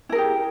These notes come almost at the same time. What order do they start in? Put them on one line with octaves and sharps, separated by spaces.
E4 A#4 G#4 G4